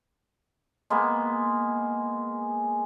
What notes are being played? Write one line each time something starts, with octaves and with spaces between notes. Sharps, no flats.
G#3 A#3 B3